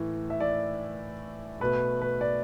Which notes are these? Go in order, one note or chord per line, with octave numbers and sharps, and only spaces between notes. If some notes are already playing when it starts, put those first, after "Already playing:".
Already playing: A2 E3 A3
E5
D5
B2 A3 B4
B4
D5